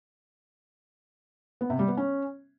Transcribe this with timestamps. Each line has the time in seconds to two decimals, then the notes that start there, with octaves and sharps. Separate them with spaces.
1.61 B3
1.70 C3
1.79 G3
1.88 B3
1.97 C#4